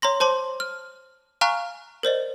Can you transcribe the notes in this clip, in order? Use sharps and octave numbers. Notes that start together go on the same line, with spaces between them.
C#5 A#5 C6 A#6
C5 A5 C6 D6
F6
F5 G#5 A#5 C#6 F6 F#6
A#4 C5 D5 D#5